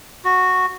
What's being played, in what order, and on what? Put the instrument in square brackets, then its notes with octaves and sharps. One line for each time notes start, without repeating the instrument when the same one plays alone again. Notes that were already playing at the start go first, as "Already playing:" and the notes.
[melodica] F#4